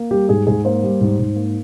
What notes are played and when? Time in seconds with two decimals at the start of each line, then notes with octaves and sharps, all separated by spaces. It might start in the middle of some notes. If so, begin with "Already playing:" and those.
Already playing: A#3
0.11 G3 G4
0.29 G#2 G#4
0.47 G#2 G#4
0.65 A#3 C5
0.83 G3
1.01 G#2
1.19 G#2
1.36 A#3